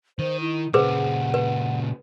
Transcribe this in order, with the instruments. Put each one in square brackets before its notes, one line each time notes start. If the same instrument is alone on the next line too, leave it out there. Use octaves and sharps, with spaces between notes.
[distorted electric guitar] D#3 [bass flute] C5
[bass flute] E4
[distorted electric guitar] A#2 C#3 [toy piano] G#4 B4 C5 [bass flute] F#5
[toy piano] B4